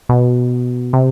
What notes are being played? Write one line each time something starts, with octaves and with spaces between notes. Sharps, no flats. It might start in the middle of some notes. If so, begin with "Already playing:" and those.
B2
C3